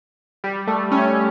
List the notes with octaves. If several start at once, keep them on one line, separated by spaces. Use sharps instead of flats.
G3
A3
C#4